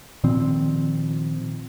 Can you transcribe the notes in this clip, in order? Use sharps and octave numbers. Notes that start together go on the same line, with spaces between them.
A#2 D#3 F3 C4